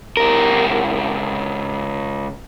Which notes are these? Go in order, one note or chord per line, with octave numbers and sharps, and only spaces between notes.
C#2 A#4